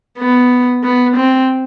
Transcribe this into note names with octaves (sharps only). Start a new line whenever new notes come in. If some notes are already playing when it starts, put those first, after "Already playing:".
B3
B3
C4